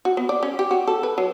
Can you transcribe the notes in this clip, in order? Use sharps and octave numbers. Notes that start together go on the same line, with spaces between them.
F#4
B3
D5
C#4
G4
F#4
A4
B4
F#3